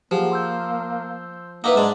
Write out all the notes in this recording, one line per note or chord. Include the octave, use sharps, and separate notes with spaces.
F3 A#3 G4 G#4 F#5
C6 E6 G6
A#3 D#4 E4 B4 F#5 A#5 D6
G#2 G#3 D4